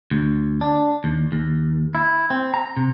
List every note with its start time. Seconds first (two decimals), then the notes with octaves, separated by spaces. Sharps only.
0.11 D2
0.61 D4
1.04 D#2
1.32 D#2
1.95 E4
2.30 C4
2.54 A#5
2.77 C3